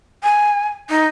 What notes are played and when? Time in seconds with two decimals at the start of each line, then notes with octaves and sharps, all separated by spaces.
0.24 G#5
0.90 D#4